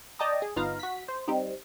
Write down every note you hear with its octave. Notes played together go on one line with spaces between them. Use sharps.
D5 D#5 G5 A5 A#5 D#6
G#4
G1 B3 D#4 F4 F5 A#5
F#4 B6
C5
G3 C4 D#4